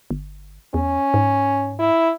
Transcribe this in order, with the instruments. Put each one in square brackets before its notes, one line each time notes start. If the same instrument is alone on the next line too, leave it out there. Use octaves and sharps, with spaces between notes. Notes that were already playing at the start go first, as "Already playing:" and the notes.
[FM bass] G1
[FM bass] E2 [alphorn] C#4
[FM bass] G#2
[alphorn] E4